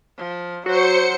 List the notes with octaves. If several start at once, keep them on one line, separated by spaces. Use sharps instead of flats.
F3
F#3 F#4 C5 C#7